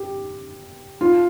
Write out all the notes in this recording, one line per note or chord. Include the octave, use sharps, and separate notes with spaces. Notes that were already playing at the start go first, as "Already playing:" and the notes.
Already playing: G4
F4